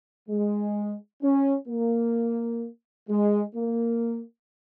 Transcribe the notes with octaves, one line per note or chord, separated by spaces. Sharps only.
G#3
C#4
A#3
G#3
A#3